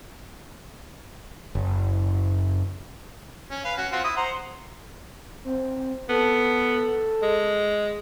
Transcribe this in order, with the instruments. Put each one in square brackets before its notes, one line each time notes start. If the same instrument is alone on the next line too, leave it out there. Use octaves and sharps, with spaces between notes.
[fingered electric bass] F#1
[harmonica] C#4
B4 F5
C#4 F#4
C4 F4 F#4
E4 D#6
C5 F#5 A#5
[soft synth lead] C4
[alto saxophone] B3 [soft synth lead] A4
[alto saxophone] G#3